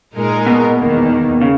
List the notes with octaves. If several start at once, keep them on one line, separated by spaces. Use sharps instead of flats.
A#2 G#3 D#4 A#4
B2
E2 D#3 A#3
C#3